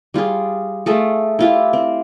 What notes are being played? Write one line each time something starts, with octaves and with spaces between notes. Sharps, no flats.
G3 F4 G4 G#4
A3 F4 G#4 A4
E4 F4 G4
C4